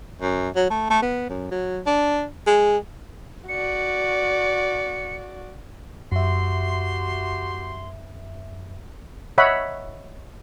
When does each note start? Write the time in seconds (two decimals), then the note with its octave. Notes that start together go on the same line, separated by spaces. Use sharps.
0.22 F#2
0.56 F#3
0.70 A3
0.90 A3
1.02 B3
1.29 F#2
1.51 F#3
1.86 D4
2.47 G#3
3.49 F#4 D5 C#7
6.12 F#2 F#4 G4 E5 C6
9.38 C#5 D#5 E5 F#5 B5